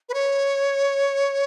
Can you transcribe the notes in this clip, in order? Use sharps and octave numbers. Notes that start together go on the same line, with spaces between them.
B4
C#5